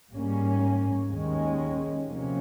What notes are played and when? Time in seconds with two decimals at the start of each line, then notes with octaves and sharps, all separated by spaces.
0.12 G#2 G3 A#3 C#4
1.10 D#2 D#3 G#3 C#4
2.07 C3 F3 A#3 C#4